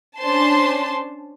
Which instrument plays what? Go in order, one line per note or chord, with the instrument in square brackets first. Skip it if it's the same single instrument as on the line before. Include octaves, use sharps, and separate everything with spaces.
[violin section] C#4 D4 C5 A5 C6